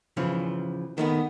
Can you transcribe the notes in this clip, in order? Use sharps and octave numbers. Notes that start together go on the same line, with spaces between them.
C#3 E3 F3
D#3 A3 B3